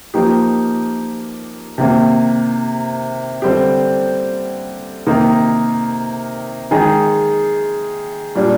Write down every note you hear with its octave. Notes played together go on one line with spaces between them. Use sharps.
F3 A#3 D#4 G4
C3 D#3 A#3
D3 G3 C4 G4
C3 D#3 A#3 D#4 A#4
D#3 G#3 D#4 G#4
A#2 G3 D4